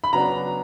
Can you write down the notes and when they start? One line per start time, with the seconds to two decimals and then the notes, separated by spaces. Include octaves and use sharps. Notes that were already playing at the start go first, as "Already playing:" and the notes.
0.04 B5
0.13 C#3 F#3 B3 D4 A#5